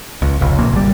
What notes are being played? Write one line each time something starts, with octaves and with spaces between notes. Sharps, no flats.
C#2
F1 C#2
E1 A#1 A#3
G#1 G3